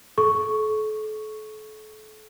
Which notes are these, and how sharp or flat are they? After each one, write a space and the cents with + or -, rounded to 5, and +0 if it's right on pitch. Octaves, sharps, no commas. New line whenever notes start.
A4 -35 C#6 +0